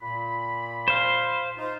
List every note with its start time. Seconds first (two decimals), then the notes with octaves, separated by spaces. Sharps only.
0.01 A#2 B5
0.88 C5 F5
1.57 D#4 F4 C5